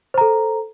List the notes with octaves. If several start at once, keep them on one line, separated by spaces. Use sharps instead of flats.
A4 C5 A#5